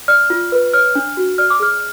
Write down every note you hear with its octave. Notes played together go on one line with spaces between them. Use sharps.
D5 F6
F4
B4
C#5 F6
D4
F#4
D5 F6
D6
G#4 F6